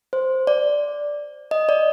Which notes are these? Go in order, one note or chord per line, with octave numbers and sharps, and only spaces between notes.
C5
D5
D#5
D5